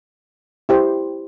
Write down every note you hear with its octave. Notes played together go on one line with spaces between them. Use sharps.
E4 G4 C5